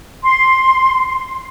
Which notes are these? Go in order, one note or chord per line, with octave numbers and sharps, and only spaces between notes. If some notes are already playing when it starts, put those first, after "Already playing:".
C6